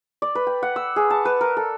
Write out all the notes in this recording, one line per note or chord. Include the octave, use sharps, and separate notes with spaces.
D5
B4
G5
F#5
E6
G#4
A5
B4
A#4
A4